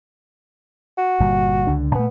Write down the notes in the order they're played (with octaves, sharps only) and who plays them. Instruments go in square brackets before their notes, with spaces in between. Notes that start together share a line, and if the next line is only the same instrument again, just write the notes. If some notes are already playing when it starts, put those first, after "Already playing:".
[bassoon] F#4
[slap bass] G1 A#2 G3
C#2 D3 D4
[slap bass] A#2 A3 [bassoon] B3